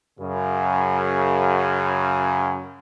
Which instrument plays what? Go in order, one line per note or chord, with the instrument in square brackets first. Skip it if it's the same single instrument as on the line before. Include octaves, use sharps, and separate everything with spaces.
[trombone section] F#2 C#3